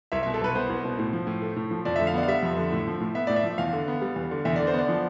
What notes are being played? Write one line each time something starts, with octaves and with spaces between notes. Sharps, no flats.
C2 E5
B2 E5
A4
C2 B4
B3 C5
C2
B2
A2
F3
A2
A3
A2
F3
F2 D5
D3 E5
F5
B3 D5
F5
G3 E5
F2
D3
A2
F3
A2
B3 E5
A2 D5
E5
F3
E2 F5
D3
B3
G3
E2
D3
E2 E5
D3 D5
C5
B3 D5
F3